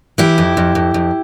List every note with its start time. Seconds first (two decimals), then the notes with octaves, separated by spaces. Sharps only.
0.18 E3 E4 G4
0.38 F2
0.57 F2
0.75 F2
0.94 F2